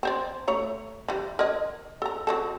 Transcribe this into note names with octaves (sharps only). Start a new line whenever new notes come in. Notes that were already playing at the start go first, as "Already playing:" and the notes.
C4 C5 D5
A3 C#5 A#5
E3 G3
A#4 C#5 D#5
A4 A#5
F#3 C4 A4